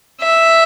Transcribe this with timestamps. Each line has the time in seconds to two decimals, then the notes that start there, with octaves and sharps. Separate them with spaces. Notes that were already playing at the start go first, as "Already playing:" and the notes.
0.22 E5